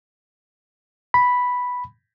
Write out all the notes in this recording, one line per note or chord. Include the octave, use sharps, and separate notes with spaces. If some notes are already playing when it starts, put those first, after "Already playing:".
B5